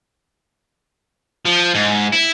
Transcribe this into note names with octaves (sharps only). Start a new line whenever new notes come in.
F3
G#2
E4